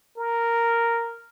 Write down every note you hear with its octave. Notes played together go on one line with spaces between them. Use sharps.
A#4